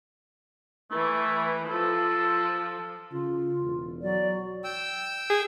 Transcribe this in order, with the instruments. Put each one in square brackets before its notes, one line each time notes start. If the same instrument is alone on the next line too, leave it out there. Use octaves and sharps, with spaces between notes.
[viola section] E3 [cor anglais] A3
[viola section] F3 [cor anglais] A4
[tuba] C#3 [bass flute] F4
[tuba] E1
[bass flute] F#3 [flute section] D5
[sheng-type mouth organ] G5 E6
[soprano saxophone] G#4